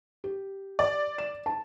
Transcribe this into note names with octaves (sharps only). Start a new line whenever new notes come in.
G4
D5
E7
A5